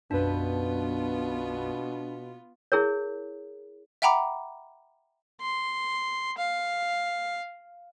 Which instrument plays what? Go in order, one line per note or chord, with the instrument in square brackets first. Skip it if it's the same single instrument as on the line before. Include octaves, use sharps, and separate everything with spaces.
[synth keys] B1 F#2 B4 [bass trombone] B2 [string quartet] B3 F4 [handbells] D4
[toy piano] E4 G#4 A#4 C#5
[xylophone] E5 F#5 G5 A#5 B5 D6
[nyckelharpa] C6
F5